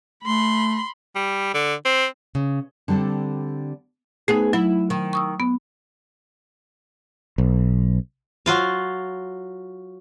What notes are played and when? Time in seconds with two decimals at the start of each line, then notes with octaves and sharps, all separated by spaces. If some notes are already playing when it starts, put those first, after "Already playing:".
0.25 A3 B5 C6
1.15 G3
1.54 D3
1.85 C4
2.35 C#3
2.88 D3 G3 C4 D4 A4
4.28 A3 B3 D#4 G#4
4.53 F#3 E4
4.90 D#3
5.13 C#6 D#6 E6
5.40 B3
7.38 B1
8.46 F#3 F4 F5